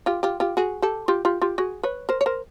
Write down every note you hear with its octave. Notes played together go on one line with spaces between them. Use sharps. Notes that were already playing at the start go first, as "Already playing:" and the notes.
F4 G4
F4 G4
F4 G4
F#4 G#4
G4 A4
F4 G4
F4 G4
F4 G4
F#4 G#4
B4 C#5
A#4 C5
C#5
A#4 C5